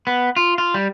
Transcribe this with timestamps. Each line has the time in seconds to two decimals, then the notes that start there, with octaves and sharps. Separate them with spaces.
0.07 B3
0.36 F4
0.58 F4
0.74 G3